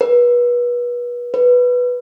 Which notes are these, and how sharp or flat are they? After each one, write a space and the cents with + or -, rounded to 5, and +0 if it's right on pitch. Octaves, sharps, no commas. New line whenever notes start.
B4 -30
B4 -5